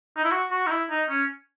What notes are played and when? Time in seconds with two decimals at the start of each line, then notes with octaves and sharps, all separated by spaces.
0.17 D#4
0.24 E4
0.31 F#4
0.51 F#4
0.66 D#4
0.70 E4
0.90 D#4
1.09 C#4